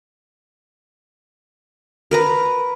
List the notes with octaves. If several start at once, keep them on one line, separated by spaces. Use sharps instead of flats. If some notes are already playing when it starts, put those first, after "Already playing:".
A#4 B4 A#5